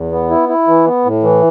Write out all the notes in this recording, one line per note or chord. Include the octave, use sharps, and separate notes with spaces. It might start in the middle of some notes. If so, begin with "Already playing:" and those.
Already playing: E2
B3
E4
E4
E3
B3
A2
E3